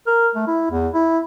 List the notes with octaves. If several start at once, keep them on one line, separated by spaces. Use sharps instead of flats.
A#4
A3
E4
E2
E4